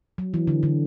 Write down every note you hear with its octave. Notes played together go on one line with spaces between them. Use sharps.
F#3
E3
D3
D3